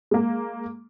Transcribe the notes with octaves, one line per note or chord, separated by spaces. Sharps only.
G#3 A#3